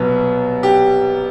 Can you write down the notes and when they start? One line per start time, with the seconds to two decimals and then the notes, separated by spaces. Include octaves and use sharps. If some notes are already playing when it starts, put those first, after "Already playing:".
Already playing: C2 B2 F#3 B4
0.63 G4